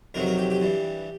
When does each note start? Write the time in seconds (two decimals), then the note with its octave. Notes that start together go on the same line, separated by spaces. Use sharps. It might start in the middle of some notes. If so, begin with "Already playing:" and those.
0.14 F2 C3 D#3 F#3 A#4
0.26 A#4
0.37 G4
0.50 G4
0.61 G2 E3